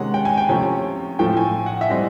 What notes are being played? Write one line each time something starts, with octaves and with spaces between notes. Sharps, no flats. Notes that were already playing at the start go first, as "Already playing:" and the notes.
Already playing: C3 D#3 G#3 C#4 F#5
G5
G#5
G5
C3 F3 A3 C#4
A2 F3 A3 G5
G#5
F#5
E5
E3 G3 C4 D#5